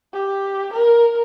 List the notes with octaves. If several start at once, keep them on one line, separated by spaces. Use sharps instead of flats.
G4
A#4